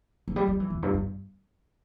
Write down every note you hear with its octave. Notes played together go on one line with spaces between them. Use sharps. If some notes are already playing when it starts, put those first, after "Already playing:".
E3
G3
G3
E3
E2
G2
G2